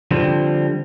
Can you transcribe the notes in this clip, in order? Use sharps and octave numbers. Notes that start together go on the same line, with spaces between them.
D3 F3 G3 C4